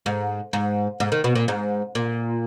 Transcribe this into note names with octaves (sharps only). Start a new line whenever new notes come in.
G#2
G#2
G#2
D#3
B2
A#2
G#2
A#2